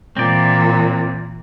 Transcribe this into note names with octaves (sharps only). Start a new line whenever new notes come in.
A#2 E3 C4 D5